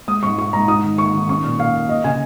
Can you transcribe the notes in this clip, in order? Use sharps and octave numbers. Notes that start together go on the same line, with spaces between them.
G#3 D#6
G#2 C#6
D#4 C#6
G#2 A#5
D#4 D#6
D#3
A#3 C#6
D#3
C#4 C#6
A#2
A#2 F5
A#3
A#3 D#5
C#3 G#5